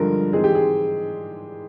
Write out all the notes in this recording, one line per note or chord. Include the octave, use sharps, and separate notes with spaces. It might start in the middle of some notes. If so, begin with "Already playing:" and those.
Already playing: G2 D3 F3 G#3 A#4
G#2 E3 G#3 C4 G#4
G4
G#4